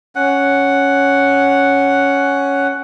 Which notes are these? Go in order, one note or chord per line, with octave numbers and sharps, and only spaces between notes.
C#4 F#5